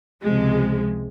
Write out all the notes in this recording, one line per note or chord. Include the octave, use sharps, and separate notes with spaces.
C#2 C3 F3 G#3